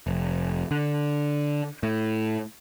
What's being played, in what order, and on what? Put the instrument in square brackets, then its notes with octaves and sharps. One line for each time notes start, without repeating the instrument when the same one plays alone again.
[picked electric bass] F1
D3
A2